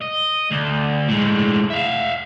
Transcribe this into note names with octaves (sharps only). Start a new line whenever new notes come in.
D#5
D2
A2 G#3
E5 F5